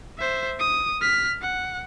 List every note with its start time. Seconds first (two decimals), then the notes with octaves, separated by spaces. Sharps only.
0.18 C5 E5
0.59 D#6
1.02 F6 B6
1.41 F#5